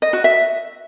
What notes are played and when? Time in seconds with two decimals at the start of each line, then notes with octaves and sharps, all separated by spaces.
0.02 D#5
0.13 F#4
0.24 E5